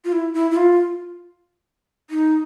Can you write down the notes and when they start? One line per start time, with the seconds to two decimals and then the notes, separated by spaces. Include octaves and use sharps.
0.04 F4
0.12 E4
0.34 E4
0.51 E4
0.56 F4
2.10 D#4